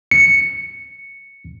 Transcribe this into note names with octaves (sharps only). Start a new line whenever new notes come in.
C#7